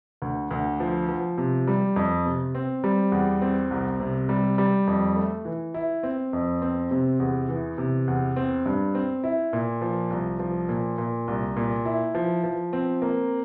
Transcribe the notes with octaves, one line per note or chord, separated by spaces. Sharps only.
D2
D2
F3
F3
C3
G3
F2
C3
C4
G3
E2
C4
C2
C3
G3
G3
F2
A3
E3
E4
C4
F2
C4
C3
E2
E3
C3
E2
C4
G2
C4
E4
A#2
F3
C2
F3
A#2
A#2
C2
A#2
E4
F3
F3
C4
A#3